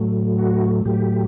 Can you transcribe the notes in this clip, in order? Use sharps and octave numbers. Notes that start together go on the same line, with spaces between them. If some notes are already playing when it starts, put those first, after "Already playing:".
Already playing: A2 F#3 A3
F#4
A2 F#3 A3 G4